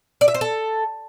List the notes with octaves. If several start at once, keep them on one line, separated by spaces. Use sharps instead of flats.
D5
E5
C5
A4